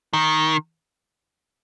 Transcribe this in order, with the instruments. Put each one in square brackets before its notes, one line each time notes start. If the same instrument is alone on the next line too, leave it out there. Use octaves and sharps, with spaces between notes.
[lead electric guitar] D#3